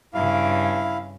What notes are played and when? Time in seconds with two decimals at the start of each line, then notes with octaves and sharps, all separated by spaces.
0.14 G2 C#3 E4 F5